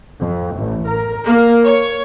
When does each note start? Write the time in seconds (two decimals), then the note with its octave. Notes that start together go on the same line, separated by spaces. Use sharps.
0.19 F2
0.56 A1
0.88 A#4
1.27 A#3
1.65 C#5